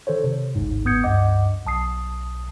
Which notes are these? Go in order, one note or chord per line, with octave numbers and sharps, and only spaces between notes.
D#3 A4 C5 C#5
C3
G#1 D2 G#2
G1 B3 D#6 G6 G#6 C#7
C#2 G2 D#5 F#5 D6
B1 A5 D#6 C7